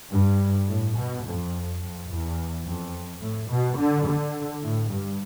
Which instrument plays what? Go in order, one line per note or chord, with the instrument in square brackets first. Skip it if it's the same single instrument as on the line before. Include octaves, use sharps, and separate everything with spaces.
[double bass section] G2
A2
B2
F2
F2
E2
F2
A2
B2
D3
D3
A2
G2